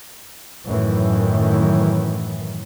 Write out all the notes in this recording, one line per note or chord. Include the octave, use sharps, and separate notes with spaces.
F#2 A2 D#3 E3